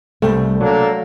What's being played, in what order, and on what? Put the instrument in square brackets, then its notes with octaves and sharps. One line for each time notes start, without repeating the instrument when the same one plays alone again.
[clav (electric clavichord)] C2 G5 [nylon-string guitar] A3
[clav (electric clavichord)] F#3 [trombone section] A#3 D4 A4